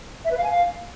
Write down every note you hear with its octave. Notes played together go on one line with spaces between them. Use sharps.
E5
B4
F5
G#5
F5